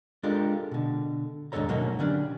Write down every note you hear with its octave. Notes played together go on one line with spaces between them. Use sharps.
G#3 D4 F4 G4 A4 A#4
B2 D3
D#2 G#2 D3 A4 C#5 A#5
B2 F#3 A3 A#3 C#4 D#4
D3 C#4 D4 G4